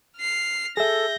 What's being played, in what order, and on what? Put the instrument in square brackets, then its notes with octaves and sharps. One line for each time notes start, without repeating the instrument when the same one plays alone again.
[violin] F6 C7
[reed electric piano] G#4 E5 [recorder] A4 [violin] G6 A#6